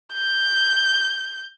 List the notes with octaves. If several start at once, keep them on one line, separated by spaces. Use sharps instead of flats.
G6